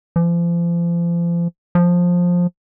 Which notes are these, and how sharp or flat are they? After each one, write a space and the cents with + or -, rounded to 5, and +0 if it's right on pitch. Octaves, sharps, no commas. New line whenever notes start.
F3 -35
F3 +15